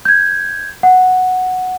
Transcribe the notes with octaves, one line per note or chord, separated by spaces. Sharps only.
G6 G#6
F#5